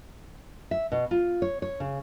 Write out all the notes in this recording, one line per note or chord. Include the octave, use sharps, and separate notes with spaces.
E5
B2
F4
C#5
C#5
C#3